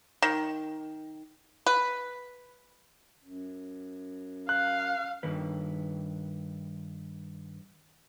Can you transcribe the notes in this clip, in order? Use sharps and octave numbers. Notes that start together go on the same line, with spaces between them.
D#3
B4
F#2
F5 F#6
G2 D#3 B4